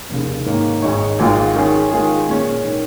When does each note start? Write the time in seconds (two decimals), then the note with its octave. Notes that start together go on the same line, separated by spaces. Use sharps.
0.10 F1 D#2 C#3
0.46 G#2 D#3 A#3 D#4 C#5
0.82 G#1 G#2 G#3 D#4 C#5
1.19 G#1 G#2 G#3 F4
1.56 D#3 C#4 G#4
1.91 D#3 G#3 F4 G#4
2.28 A#2 G#3 C#4
2.65 D#3